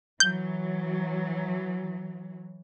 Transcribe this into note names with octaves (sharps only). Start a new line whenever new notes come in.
E3 F#3 G6